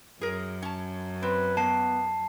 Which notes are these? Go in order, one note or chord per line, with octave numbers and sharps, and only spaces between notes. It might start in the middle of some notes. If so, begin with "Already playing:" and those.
F#2 G#4 A#4
C#4 A5
C4 B4
F#3 A#3 B3 A5 C7